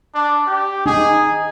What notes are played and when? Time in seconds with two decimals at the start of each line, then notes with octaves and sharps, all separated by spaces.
0.14 D4
0.47 G4
0.86 D#4 G#4